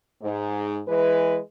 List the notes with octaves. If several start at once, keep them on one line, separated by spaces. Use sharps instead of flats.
G#2
E3 G#3 B4